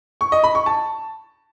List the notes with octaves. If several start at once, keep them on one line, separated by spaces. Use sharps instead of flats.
C#6
D#5
B5
C#6
A5